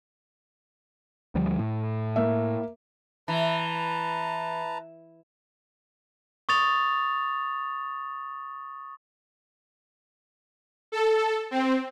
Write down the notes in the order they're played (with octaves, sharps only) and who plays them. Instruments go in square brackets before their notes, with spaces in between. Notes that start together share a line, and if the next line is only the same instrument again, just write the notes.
[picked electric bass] D2 F3 G3
A2
[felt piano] A#3 E5
[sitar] E3 [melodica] B4 A5 A#5
[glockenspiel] C#6 D#6 A6 F7
[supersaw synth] A4
C4